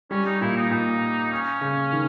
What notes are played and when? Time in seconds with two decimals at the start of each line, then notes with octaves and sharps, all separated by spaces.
0.11 G3 C#4
0.26 D#4
0.41 A#2 E4
0.56 D#4
0.71 A#2
1.31 C#4
1.61 C#3
1.92 D#3